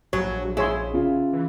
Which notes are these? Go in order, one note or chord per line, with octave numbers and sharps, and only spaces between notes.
A#1 F#3 C#5
E4 G#4 C#5 C6
C#3 F4
E3